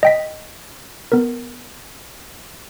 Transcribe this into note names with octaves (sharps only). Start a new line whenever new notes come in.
D#5 G5 B6
B3 A#4